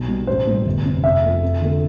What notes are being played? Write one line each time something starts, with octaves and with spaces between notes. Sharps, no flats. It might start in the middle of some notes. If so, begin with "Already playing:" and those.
Already playing: B1
B2 G3
A1 C5
A2 G3
G1
F2 C3
F1 E5
F2 C3 F3 A3
F2
D3 A3